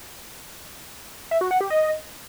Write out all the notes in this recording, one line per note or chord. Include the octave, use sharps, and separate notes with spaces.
E5
F#4
F#5
G4
D#5